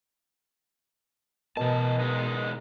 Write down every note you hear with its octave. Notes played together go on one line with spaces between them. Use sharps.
B2 E3 A#4 B4 D#5 A5
E2 G#3 D#4